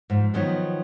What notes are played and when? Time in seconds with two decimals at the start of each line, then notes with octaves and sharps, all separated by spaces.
0.10 G#2 F3
0.34 D#3 F3 F#3 B3 D#4